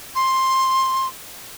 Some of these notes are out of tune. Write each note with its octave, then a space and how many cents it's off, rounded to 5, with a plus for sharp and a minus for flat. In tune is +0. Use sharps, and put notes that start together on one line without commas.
C6 +10